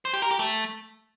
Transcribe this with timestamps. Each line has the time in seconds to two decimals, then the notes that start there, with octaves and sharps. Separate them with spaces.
0.05 C5
0.14 G4
0.22 A#4
0.31 G4
0.39 A3